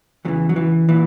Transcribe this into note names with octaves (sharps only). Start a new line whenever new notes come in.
E2 C#3 E3 F#3
F#3
E3
A#2 E3